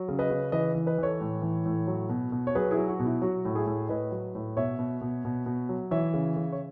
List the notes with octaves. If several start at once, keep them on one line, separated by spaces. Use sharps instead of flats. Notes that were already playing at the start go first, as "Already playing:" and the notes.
Already playing: F#3
C#3
B4 D#5
C#3
E3 B4 D#5
E3
B4 D#5
E3 A4 C#5
A2
E3
A2
F#3
B2
B2
C#5
F#3 G#4 B4
E4 G#4
F#3
F#4
B2
E4
F#3 F#4
A2
E4 G#4
A2
A2 B4 D#5
F#3
A2
B2 C#5 E5
B2
B2
B2
B2
F#3
E3 C#5 E5
C#3
C#3
C#5